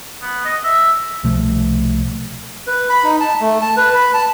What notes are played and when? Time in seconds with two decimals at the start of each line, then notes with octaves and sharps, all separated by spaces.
0.22 B3
0.45 D#5
0.64 E5
1.24 C2 B2 F3 A3
2.67 B4
2.90 B5
3.04 D#4
3.20 A5
3.41 A3
3.61 A5
3.77 B4
3.95 B5
4.14 A5